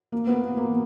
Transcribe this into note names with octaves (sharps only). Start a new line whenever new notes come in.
A#3
B3
A#3
A#3